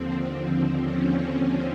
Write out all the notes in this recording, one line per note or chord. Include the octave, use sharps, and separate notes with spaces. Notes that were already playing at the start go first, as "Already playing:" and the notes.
Already playing: D#2 D3 F3 C4
C#4